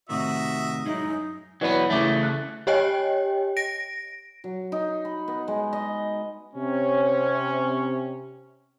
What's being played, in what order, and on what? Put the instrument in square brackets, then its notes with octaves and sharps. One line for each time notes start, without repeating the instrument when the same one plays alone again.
[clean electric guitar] A2 C3 D#3 [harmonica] F#4 D#5 E5
[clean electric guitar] F#3 G#3 E4 [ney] D#4
[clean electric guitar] F#2
[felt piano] E3 B4 D5 [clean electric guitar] F#3 B3
[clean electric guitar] C#3 A3 [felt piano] E3 D6
[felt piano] F#6
[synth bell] G4 C#5 D#5 G5 G#5
A#6 D7
[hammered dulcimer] F#3
D#4
B5
B3
G#3
D#5
[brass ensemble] C3 C#4